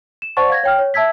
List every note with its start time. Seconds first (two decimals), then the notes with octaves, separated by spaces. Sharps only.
0.22 E7
0.37 C5 D5 F#5 A5 C#6 A6
0.50 F5 G#6 A#6
0.64 C#5 G5 F6
0.79 C#5
0.94 E5 A5 E6 G#6 B6